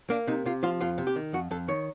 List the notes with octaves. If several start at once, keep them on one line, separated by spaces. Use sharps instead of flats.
A#3 D4
C3 D#4
C3 F4
F3 F4
F2 F4
C3
G4
D#3
F2 F#4
F2 A4
D#3 C#5